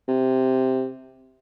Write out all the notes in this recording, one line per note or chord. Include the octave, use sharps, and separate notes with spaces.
C3